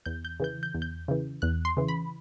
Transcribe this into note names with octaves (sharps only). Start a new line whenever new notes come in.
E2 G6
G6
C#3 E3 G6
G6
E2
G6
C#3 E3
E2 F#6
C6
C#3 E3
B5